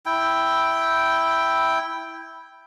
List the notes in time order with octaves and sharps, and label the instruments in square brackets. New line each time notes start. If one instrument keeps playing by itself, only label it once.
[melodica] E4 G5